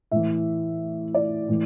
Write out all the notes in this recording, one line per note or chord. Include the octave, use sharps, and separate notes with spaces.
A2 E3 E5
D5
A2 E3